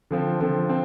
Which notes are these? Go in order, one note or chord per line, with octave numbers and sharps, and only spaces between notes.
D3 F3 C4
D3 F3 C4
C4